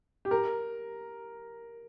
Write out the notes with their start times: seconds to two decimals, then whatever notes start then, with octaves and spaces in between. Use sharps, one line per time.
0.25 G4
0.31 A#4